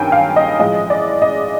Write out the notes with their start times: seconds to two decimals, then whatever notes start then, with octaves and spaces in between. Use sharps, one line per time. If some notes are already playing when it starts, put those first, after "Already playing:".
Already playing: G2 D#3 F#3 A#3 C#4 G5 G#5
0.12 F5
0.36 D#5
0.59 A2 F3 G#3 D#5
0.90 D5
1.22 D#5